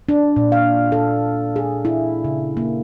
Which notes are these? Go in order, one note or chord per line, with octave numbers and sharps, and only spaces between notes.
D4
A#2
F5
A4
G#4
E4
C#3
A#3